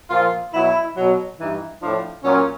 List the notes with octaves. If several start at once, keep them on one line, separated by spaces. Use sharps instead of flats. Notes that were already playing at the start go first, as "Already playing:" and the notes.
A#2 F3 F4
B2 F#3 E4
B2 F#3
G2 E3 D#4
A2 F3 D4
A#2 F#3 C#4